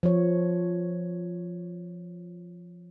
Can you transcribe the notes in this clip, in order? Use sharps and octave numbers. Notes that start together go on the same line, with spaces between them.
F3 C#5